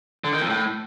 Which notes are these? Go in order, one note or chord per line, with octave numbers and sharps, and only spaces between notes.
D3
D#3
F2
A2